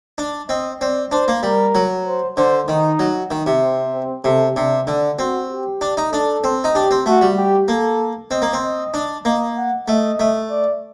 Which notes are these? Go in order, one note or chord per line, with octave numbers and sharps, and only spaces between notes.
D4
C4 D#5
C4 D5
D4 C5
A#3
G3 A#4
F#3
C5
D3 C5
D#3 D#4
F#3
D#3
C3
C4
C4
C3 A4
C3 D4
D3 D4
C4 F#4
G4
D4
D#4
D4 A4
C4
D#4
D4 G4
C4
A3 F#4
G3
G4
A#3 A4
C4 D#5
A#3
C4
D#5
D4
A#3 D#5
F#5
A3 D#5
A3
D5